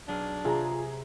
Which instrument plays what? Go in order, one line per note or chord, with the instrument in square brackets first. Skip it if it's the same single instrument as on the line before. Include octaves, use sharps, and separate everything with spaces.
[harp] B1 G#4 F6 [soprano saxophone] D4
[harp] C3 [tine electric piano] F4 [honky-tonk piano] G#4 A#5